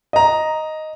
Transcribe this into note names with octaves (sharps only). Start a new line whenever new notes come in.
D#5 A#5